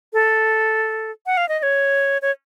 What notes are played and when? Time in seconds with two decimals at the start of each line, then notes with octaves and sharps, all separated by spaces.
0.13 A4
1.26 F#5
1.37 F5
1.49 D#5
1.59 D#5
1.63 C#5
2.22 C#5